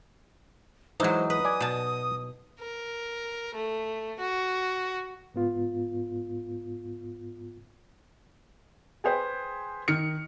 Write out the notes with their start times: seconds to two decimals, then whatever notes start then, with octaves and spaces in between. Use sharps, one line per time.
1.00 E3 F#3 G#3 D#4 C5
1.30 B4 D#6
1.45 D5 G#5
1.60 B2 A5
2.60 A#4
3.55 A3
4.19 F#4
5.34 G#2 B3 F4
9.04 G#4 B4 C5 G5
9.88 D#3 F6 C#7